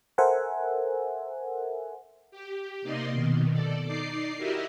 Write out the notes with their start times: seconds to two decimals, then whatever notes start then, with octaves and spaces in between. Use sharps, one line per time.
0.18 A4 A#4 C5 E5 F#5 G#5
2.31 G4
2.82 C3 A#3 D#4 D5 D#5 C6
3.12 B2 D#3
3.52 A4 D5
3.87 D#4 D5 D6 C7
4.37 E4 F#4 G4 A#4 D#5 E5